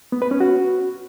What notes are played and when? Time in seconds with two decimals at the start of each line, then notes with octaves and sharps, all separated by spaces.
0.12 B3
0.22 B4
0.31 C#4
0.40 F#4